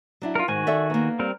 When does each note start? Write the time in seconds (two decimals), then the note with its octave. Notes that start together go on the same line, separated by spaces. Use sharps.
0.22 F#3 D4 E4
0.35 F4 A#4
0.48 G#2 D#3 F#4 G#5
0.67 A4 D5 E5
0.90 A#3 B3
1.19 G3 C4 A#4